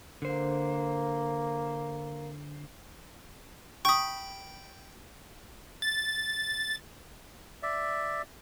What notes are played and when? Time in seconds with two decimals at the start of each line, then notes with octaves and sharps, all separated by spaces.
0.22 D3 A#3 C5
3.85 G5 B5 C#6 D#6
5.82 A6
7.63 D5 E5